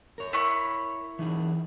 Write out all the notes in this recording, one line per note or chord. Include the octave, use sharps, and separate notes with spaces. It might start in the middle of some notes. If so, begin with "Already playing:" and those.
A#4 C#5
E4 B5 C#6
E3 D#4 G#4